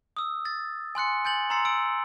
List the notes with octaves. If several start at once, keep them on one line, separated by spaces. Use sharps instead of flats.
D#6 E6
A6
G#5 C6 F#6 C#7
G#5 G6 A6 F#7
A#5 C6 E6 A6 C7 C#7
E6 D7